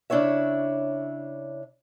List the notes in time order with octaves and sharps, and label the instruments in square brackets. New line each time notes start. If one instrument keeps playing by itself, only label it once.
[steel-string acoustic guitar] C#3 D4 E4 C#5 E5